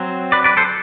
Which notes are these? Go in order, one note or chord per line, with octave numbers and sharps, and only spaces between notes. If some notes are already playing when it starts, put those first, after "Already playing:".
Already playing: F#3 C4
B4 D5
B4 D5
A4 C5